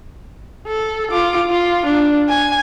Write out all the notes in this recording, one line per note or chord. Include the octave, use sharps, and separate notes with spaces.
A4
F4 D6
F4
D4
G#5